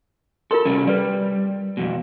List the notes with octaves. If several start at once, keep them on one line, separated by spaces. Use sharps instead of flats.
F4 A4 A#4 C6
C3 G3 C#4
G3 B4 D5
F2 B2